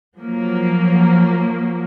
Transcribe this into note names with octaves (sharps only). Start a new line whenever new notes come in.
F3 F#3 A#3